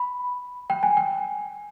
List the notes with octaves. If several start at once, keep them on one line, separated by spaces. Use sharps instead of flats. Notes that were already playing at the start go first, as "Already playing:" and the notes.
Already playing: B5
G5
G#5
G5